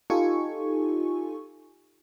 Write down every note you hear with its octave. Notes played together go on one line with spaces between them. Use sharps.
D#4 F4 G4 A4 G#5 C#6